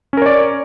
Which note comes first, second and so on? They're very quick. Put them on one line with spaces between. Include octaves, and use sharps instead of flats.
C#4 A#4 C#5 D5